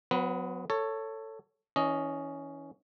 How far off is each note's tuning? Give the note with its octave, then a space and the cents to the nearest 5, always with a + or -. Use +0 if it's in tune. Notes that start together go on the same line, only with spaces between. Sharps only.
F#3 -25 B3 +30 B4 -20
A4 +15 C#5 +0
E3 -30 C#4 +10 D#5 +0